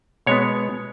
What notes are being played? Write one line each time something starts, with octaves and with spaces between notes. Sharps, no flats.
B2 G#3 B3 C#5